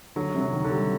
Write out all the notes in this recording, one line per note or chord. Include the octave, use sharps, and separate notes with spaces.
D3 F#3
C3
F#3
D#3
D3
G3